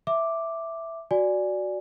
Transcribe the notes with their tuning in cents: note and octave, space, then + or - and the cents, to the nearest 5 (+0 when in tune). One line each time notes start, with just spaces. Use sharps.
E5 +0 D6 +0
F#4 +0 D5 +0 G#5 +0